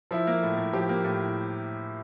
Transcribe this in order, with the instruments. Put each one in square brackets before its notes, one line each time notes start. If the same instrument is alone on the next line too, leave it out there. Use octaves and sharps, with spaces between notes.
[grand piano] F3 E4
A#3
A2
A2
F3 G4
A#3
A2